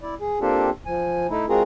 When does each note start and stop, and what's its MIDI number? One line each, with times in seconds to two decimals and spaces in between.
0.02 0.14 64
0.02 0.14 74
0.20 0.39 68
0.41 0.70 58
0.41 0.70 60
0.41 0.70 62
0.41 0.70 65
0.41 0.70 67
0.41 0.70 69
0.86 1.27 53
0.86 1.27 80
1.30 1.46 57
1.30 1.46 63
1.30 1.46 64
1.49 1.63 56
1.49 1.63 60
1.49 1.63 65
1.49 1.63 66
1.49 1.63 68
1.49 1.63 70